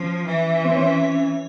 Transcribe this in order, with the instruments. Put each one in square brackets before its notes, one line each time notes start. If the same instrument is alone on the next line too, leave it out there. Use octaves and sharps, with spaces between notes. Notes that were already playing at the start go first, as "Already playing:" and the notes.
Already playing: [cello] F3 [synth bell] C#4
[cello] E3
[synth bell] C4
C#4